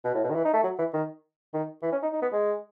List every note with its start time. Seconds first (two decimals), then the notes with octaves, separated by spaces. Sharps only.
0.04 B2
0.14 A2
0.24 B2
0.30 D#3
0.35 E3
0.45 D#4
0.54 A3
0.64 F#3
0.79 E3
0.94 D#3
1.54 D#3
1.83 E3
1.92 C#4
2.03 D#4
2.13 D#4
2.22 B3
2.32 G#3